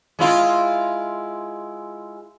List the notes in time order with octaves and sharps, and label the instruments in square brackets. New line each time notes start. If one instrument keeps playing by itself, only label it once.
[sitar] G#3 E4 F4